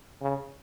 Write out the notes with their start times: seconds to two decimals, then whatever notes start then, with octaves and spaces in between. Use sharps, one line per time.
0.21 C#3